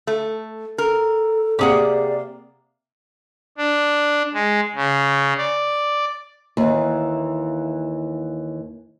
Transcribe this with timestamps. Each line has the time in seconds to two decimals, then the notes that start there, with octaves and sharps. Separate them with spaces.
0.07 A3
0.78 A4 A#4
1.59 C3 A#3 G4 G#4 D5 F#5
3.58 D4
4.34 G#3
4.75 C#3
5.38 D5
6.57 D#2 E3